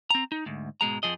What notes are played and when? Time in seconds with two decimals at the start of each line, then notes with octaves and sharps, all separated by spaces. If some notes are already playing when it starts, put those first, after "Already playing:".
0.11 C4 A#5
0.32 D#4
0.46 D2 G#2
0.81 G#2 B2 G#3 A#5
1.03 F2 G#2 F3 G#4 D#5